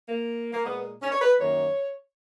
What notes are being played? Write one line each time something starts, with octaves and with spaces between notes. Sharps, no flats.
A#3
A#3
A#2 G#3 B3
C#4
C#5
B4
F#2 D#3 A#3 C#5